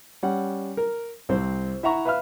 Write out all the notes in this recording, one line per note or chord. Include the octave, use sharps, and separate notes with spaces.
G3 C#4 F#5
A#4
C2 C4 C5
E4 E5 F#5 A#5 C#6
B4 E5 F5 B5 F6